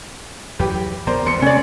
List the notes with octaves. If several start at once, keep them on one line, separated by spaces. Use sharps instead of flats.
E2 F#3 G4 B4
A#1 D#3 B3 A#4 C5 D5
E1 E2 C6 C#7
C3 G#3 A#3 C#4 D5